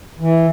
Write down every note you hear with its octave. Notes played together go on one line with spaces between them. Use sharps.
E3